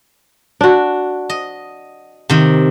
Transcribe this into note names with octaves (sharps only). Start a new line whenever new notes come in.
D4 F#4
D#5
C3 D#3